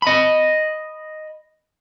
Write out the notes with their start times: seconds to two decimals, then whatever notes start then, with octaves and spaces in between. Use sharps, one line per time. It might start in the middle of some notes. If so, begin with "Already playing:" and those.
0.02 D#5 B5